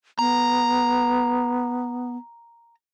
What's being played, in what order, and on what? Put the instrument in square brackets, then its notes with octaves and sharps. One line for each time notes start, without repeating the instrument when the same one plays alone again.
[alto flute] B3 [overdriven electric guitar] A#5